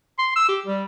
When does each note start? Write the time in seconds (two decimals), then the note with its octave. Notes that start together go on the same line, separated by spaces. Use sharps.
0.19 C6
0.35 E6
0.48 G4
0.66 G3